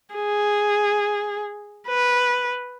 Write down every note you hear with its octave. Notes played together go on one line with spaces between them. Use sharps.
G#4
B4